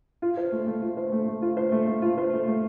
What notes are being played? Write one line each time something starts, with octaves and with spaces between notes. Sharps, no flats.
F4
C5
A3
A3
F4
C5
A3
A3
F4
C5
A3
A3
F4
C5
A3
A3